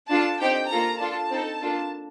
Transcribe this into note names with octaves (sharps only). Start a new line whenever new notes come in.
D4 F4 A4 A5
C4 D#4 G4 G5
A#3 F4 A4 A#5
D4 F4 A4 A5
C4 D#4 A4
A#3 D4 F4 A4